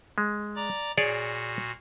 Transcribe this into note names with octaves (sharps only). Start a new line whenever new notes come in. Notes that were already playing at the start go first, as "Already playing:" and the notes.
G#3
D5 A#5 D6
A#2 F#4 G#4 C#5 D5